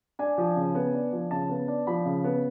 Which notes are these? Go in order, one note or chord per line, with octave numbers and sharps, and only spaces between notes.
D4 G#5
F3
C#3
B3
D4
F3
C#3 A5
B3
D4
F3 B5
C#3
B3